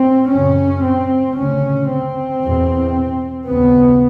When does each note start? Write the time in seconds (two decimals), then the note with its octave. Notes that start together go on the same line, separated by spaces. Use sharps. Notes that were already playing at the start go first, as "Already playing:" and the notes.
Already playing: C4
0.31 F#2 C#3 C#4
0.84 C4
1.37 D2 C#3 C#4
1.90 C4
2.43 E2 B2
3.48 D#2 C#3 B3